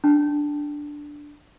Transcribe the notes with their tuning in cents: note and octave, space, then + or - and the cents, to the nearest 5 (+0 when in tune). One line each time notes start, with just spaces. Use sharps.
D4 +0 A5 +0